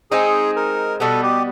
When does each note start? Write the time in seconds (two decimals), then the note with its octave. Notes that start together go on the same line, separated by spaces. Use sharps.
0.11 G#3 C4 D#4 G#4
0.56 A#4
1.00 B2 G3 B3 A4
1.23 G4